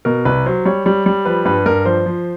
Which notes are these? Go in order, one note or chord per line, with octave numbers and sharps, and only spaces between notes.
B2 A#4
C2 B4
F#3 C5
G3 C#5
G3
G3
F3 B4
G2 B4
G2 A#4
F3 C5
F3